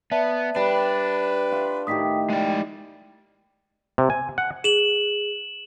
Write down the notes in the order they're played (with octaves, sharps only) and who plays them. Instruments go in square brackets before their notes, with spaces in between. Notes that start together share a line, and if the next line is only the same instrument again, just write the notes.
[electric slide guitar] B3 [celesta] D5 E5 A5
[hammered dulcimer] G3 [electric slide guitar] D4 [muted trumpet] B4
[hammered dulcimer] F4
[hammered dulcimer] A2 D#3 G4 [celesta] D#6 B6
[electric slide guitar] G#3 D5 [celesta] G5
[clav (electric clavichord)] C3
G#5
F#5
[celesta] G#4 [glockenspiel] E7 F#7